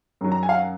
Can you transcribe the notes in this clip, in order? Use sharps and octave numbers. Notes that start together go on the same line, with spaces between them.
F#2 D#3 F#3
A#5
G#5
F5
F#5